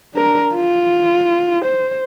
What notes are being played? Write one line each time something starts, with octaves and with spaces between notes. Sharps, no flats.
D4 A#4
F4
C5